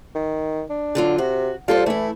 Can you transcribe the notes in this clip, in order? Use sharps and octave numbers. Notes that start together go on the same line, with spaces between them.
D#3
D4
D3 F#3 F4
C3 F#4
G3 F4 A4 C5
E3 A3 E4